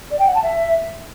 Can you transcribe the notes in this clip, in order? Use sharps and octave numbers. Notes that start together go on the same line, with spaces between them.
D5
G5
F#5
A5
E5